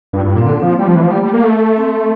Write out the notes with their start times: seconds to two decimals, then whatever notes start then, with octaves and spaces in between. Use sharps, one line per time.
0.13 G2 F4
0.21 E4
0.25 G2
0.30 D4
0.35 A#2
0.38 C4
0.46 D3 A#3
0.60 F3 C4
0.69 A#3
0.79 G3 A3
0.87 F3
0.96 E3
1.03 F3
1.11 G3 A#3
1.23 G3
1.33 A#3
1.43 A3
1.77 C4